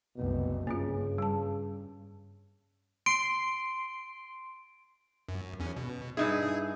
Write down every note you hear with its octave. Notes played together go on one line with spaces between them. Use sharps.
F#1 C2 B2
G2 C#3 A#3 C#4 F4
G3 A5
C6 D7
F#2
E2 C#4
B2
G2 D#4 E4 G#4